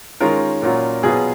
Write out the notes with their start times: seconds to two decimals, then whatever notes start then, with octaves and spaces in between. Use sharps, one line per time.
0.20 D#3 G#3 C#4 F4 A#4
0.62 A#2 F#3 C#4 F4
1.03 B2 F#3 B3 F4 G#4